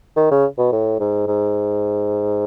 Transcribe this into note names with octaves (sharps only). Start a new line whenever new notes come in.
D#3
C#3
B2
A2
G#2
G#2